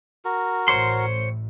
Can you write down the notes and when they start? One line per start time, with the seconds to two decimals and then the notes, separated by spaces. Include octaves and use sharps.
0.25 F#4 A#4
0.68 A1 A2 C5 C#5 C6